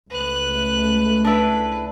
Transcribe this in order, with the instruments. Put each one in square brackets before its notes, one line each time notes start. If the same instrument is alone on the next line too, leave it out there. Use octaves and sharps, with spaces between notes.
[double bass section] C#2 A3 [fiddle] B4 F#6
[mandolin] D4 E4 [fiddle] B4